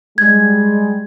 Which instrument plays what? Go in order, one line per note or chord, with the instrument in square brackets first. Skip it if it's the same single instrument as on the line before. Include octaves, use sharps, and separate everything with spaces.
[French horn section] G3 G#3 [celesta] G#6